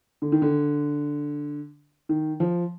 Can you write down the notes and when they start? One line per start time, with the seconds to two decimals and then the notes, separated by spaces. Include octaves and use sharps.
0.22 D3
0.32 D#3
0.42 D3
2.09 D#3
2.40 F3